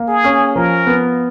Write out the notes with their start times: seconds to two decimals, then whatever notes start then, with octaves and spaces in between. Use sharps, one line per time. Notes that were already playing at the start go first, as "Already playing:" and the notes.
Already playing: A#3
0.08 G#4
0.24 C#4
0.55 F3 A#4
0.87 B3